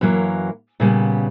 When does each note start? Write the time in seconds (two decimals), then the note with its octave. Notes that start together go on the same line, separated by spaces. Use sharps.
0.01 F#2 E3 F#3 A#3
0.80 A#2 C#3 G3 B3